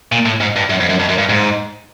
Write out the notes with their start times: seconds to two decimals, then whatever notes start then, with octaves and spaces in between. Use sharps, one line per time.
0.12 A#2
0.26 A2
0.41 G#2
0.56 G2
0.70 F#2
0.80 F2
0.89 F#2
1.00 F2
1.09 F#2
1.18 G2
1.29 G#2